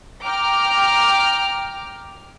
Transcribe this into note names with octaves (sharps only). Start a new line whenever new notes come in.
G5 A#5 D6 F6